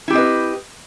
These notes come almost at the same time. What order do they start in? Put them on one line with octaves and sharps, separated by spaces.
E4 G4 C4 D#5 B4